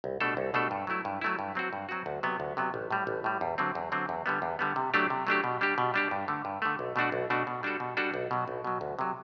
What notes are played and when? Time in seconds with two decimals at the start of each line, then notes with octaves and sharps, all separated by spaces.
0.04 C2
0.20 B2 A3 D4 A4
0.37 C2
0.54 B2 A3 D4 A4
0.71 G2
0.87 F#3 A3 E4
1.05 G2
1.21 F#3 A3 E4
1.39 G2
1.55 F#3 C4 F#4
1.73 G2
1.89 F#3 C4 F#4
2.06 D2
2.23 C3 F#3 B3
2.40 D2
2.57 C3 F#3 B3
2.74 A1
2.91 A2 G3
3.07 A1
3.24 A2 G3
3.41 E2
3.58 D3 F#3 C4
3.75 E2
3.92 D3 F#3 C4
4.09 E2
4.26 D3 G3 B3
4.42 E2
4.59 D3 G3 B3
4.76 C3
4.94 F#3 A3 D4 G4
5.10 C3
5.27 F#3 A3 D4 G4
5.44 B2
5.61 G3 D4 G4
5.78 B2
5.94 G3 D4 G4
6.11 G2
6.28 D3 A3
6.45 G2
6.62 D3 A3
6.79 B1
6.96 B2 A3 D4 F#4
7.12 B1
7.30 B2 A3 D4 F#4
7.47 B2
7.63 G3 D4 F#4 A4
7.80 B2
7.97 G3 D4 F#4 A4
8.14 B1
8.31 B2 F#3
8.48 B1
8.64 B2 F#3
8.81 D2
8.99 C3 F#3